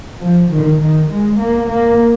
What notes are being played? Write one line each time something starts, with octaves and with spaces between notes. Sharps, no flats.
F3
D#3
D#3
G#3
A#3
A#3